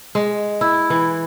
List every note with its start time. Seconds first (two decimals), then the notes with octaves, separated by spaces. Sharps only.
0.15 G#3
0.61 E4
0.90 E3